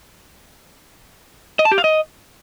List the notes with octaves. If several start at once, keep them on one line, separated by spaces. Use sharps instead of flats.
D#5
A5
G4
F5
D#5